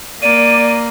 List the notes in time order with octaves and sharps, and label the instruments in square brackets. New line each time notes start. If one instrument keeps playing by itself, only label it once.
[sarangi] A#3 [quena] D5 [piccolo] D#7